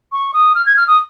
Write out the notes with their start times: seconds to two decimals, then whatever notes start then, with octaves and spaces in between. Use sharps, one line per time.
0.12 C#6
0.34 D#6
0.55 F6
0.66 G#6
0.77 F6
0.88 D#6